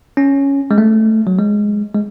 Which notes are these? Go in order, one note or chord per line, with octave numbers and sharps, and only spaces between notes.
C#4
G#3
A3
F#3
G#3
G#3